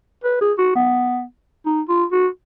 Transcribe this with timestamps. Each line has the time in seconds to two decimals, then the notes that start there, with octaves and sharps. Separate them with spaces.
0.24 B4
0.41 G#4
0.59 F#4
0.76 B3
1.66 D#4
1.89 F4
2.12 F#4